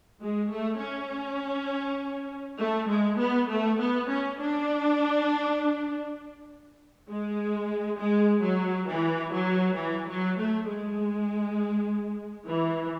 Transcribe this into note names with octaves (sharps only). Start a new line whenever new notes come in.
G#3
A3
C#4
A3
G#3
B3
A3
B3
C#4
D4
G#3
G#3
F#3
E3
F#3
E3
F#3
A3
G#3
E3